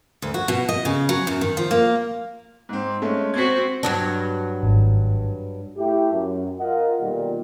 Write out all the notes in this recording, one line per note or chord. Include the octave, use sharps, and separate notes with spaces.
D2
F#4
B2
D#5
C#3
F#3
F#2
D#3
F3
A#3
G#2 C4
G#3 A3 C#4
C4 F#4 G#6 B6
G2 F#3 D4
G#1
A3 E4 G4
F#2
F4 A#4 D#5 F#5
B1 A#2 D#3 G3